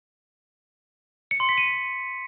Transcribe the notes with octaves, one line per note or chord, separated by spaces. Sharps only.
C#7
C6
B6
D#7